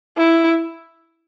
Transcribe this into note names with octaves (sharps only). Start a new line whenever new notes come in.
E4